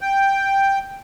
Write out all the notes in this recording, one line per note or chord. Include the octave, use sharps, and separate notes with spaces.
G5